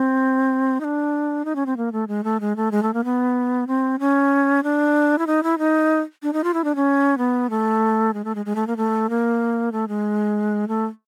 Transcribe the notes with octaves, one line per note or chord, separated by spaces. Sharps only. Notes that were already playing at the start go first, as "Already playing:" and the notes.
Already playing: C4
D#4
D4
D#4
C#4
C4
A#3
A3
G#3
A3
G#3
A3
G#3
A3
A#3
B3
C4
C#4
D4
E4
D#4
E4
D#4
D4
D#4
F4
E4
D4
C#4
B3
A3
G#3
A3
G#3
G#3
A3
A#3
A3
A#3
A3
G#3
A3